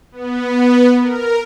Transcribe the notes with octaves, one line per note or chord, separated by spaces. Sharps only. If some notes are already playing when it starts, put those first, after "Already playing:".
B3
A#4